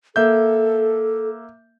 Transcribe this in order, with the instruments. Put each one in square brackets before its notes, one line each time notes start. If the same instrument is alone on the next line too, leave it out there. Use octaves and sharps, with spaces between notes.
[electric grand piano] A#3 E5 G6 [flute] A4